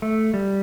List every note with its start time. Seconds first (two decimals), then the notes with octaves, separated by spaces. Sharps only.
0.02 A3
0.34 G3